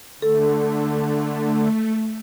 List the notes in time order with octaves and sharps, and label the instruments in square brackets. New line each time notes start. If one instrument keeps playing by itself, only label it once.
[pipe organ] D3 [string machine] A3 [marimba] A4